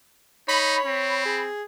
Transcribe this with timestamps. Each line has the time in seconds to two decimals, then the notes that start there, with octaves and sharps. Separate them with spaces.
0.48 D#4 C#5 B5
0.85 C4
1.26 G#4